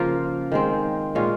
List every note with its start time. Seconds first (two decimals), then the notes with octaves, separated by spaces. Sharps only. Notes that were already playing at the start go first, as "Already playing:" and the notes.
Already playing: C#3 F3 A#3 F4
0.52 D#3 G#3 C4
1.15 A#2 G#3 C#4 F4